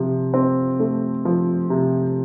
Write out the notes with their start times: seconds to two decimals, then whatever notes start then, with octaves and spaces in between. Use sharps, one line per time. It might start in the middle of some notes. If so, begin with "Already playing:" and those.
Already playing: C3 F3
0.34 C4
0.79 A3
1.25 F3
1.70 C3